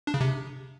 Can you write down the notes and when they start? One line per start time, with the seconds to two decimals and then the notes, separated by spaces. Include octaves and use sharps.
0.07 D4
0.14 C#3
0.21 C3